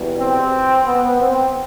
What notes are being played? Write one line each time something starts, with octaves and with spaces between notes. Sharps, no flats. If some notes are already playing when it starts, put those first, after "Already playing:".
Already playing: E2 B2 G3
C4
B3
C4